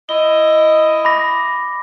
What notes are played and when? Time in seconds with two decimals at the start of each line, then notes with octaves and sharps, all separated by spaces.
0.09 E4 D#5 G7
1.05 B5 D6 A#6